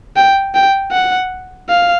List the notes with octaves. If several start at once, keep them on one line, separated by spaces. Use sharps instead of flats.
G5
G5
F#5
F5